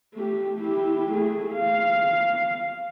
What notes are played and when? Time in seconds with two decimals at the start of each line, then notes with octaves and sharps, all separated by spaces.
0.15 A3 G4
0.59 E4 G4
1.12 A3 G#4
1.54 F5